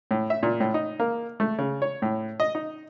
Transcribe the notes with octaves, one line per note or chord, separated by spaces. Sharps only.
A2
E5
A#2
A2
D#4
A#3
A3
C#3
C#5
A2
D#5
D#4